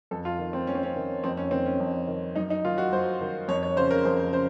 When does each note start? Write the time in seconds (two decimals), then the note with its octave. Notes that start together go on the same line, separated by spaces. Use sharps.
0.11 F2 A4
0.25 F4
0.39 D#3
0.53 C4
0.67 F2 C#4
0.75 C4
0.83 C#4
0.96 D#3
1.24 F2 C4
1.37 C#4
1.51 D#3 C4
1.66 C#4
1.80 F2
2.08 D#3
2.36 F#2 D#4
2.50 D#4
2.64 D#3 F4
2.78 F#4
2.92 F#2 C5
3.21 D#3
3.48 F2 C#5
3.63 C#5
3.76 C#3 C5
3.91 A#4
4.05 F2 C5
4.33 C#3 C5